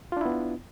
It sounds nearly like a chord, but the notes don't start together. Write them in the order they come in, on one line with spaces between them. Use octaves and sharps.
F4 D4 E4 B3